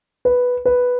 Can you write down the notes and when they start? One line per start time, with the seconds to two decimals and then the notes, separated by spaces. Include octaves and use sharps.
0.25 B4
0.65 B4